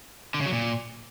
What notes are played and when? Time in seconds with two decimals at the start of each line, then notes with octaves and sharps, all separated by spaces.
0.34 D3
0.40 C#3
0.46 F#3
0.52 A#2